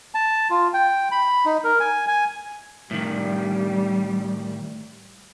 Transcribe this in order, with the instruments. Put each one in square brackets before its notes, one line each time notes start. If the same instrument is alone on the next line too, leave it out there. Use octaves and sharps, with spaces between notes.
[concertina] A5
F4
G5
B5
D#4
A#4
G#5
G#5
[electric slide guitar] A2 D#3 [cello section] G3